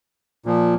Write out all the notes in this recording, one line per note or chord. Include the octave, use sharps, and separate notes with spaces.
A#2 F3